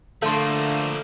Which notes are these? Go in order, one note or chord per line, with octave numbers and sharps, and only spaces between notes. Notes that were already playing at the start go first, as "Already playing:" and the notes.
D3 F3 A3 A#3 A4 C6